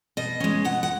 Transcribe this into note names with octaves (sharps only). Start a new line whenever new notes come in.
B2 D#5
G#3 C#4
B2 F#5
F#5